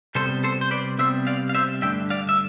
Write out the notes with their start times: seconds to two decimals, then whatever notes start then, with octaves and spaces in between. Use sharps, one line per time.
0.15 C3 G3 B3 A4 C5
0.44 A4 C5
0.61 C5
0.71 B4 D5
0.98 C3 G3 B3 C5 E5
1.27 D5 F5
1.49 F5
1.55 C5 E5
1.82 G2 D3 A3 D4 E5 G5
2.10 D5 F5
2.29 E5